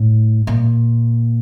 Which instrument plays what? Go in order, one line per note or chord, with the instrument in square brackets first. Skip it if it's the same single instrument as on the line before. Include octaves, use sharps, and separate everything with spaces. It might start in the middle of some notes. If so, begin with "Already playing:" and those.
Already playing: [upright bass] A2
A#2